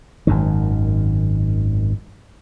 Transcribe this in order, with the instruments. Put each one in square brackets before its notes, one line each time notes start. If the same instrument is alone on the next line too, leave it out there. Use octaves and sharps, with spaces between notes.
[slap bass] G#1 F#2 D#3